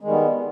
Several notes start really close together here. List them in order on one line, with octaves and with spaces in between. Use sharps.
G#3 D#3 G3 B3